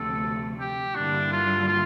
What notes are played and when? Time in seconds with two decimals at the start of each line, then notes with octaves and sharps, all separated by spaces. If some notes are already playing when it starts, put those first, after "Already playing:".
Already playing: D2 C3 F3 A3 A4
0.60 G4
0.96 G2 D3 G3 A#3 D4 E4
1.32 F4
1.68 F4